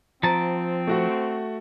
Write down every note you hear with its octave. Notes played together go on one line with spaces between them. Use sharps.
F3 C4 A5 A#5
A3 F#4 F#5